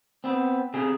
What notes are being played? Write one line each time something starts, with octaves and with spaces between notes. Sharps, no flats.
B3 C4
C3 G#4